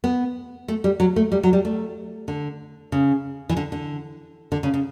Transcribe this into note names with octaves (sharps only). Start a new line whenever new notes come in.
B3
A3
G3
F#3
A3
G3
F#3
G3
A3
D3
C#3
E3
D3
D3
D3
C#3
C#3